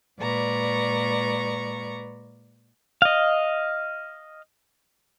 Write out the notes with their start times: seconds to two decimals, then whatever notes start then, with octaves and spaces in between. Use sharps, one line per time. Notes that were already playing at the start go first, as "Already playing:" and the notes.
0.18 A#2 G#3 B4 D5 A#5 C#6
3.02 D#5 F5